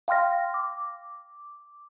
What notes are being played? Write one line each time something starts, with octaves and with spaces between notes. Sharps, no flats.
F5 G5 C6 F6 A#6
D6